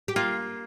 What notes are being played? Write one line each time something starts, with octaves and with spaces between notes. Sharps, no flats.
G4
A#3 F4